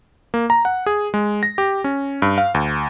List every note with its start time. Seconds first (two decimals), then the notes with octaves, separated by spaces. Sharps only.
0.34 A#3
0.50 A#5
0.65 F#5
0.86 G#4
1.14 G#3
1.43 A#6
1.58 G4
1.84 C#4
2.22 G2
2.38 F5
2.54 D2